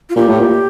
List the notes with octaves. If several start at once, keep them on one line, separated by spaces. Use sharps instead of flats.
F4
A#2 G4
A2
A#2